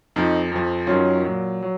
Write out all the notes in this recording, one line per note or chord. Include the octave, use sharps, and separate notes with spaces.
F2 F3 D#4
F2 F3
F#2 D#3 F#3 C#4 F4
A#2 F#3
F#3